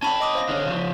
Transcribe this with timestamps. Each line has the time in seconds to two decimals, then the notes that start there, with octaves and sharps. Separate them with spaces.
0.02 C#4 G5 A5 B5
0.20 D#5 D6 D#6
0.35 C5 F5 A#6
0.49 D3 C#4
0.65 C#3 F3
0.77 F4